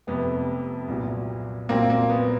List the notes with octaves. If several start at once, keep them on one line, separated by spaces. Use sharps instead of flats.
F1 F2 C3 B3
C2 A#2 F#3
C2 A#2 F#3 A#3 C4
A#3
B3